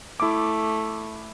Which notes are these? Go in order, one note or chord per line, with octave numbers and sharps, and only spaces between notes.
A3 E4 D6